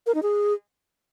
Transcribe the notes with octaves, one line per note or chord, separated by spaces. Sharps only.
A#4
D#4
G#4